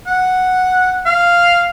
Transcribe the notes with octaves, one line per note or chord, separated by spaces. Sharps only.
F#5
F5